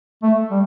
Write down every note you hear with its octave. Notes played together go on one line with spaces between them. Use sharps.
A3
G3